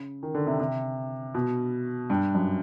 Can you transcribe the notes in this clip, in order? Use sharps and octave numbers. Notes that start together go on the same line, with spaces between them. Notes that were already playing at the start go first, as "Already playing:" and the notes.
Already playing: C#3
D#3
D3
C3
C3
B2
G2
F#2